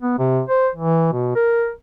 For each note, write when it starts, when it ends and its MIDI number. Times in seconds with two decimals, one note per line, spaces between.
0.02 0.15 59
0.19 0.41 48
0.48 0.69 72
0.75 1.11 52
1.13 1.35 47
1.36 1.71 70